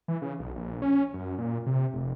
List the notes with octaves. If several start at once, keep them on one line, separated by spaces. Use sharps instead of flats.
E3
C#3
B1
A#1
C#4
F#2
A#2
C3
F1